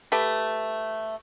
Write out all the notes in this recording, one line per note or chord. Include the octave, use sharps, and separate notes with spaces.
A3 G4 B4